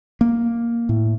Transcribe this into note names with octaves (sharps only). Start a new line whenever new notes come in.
A#3
A2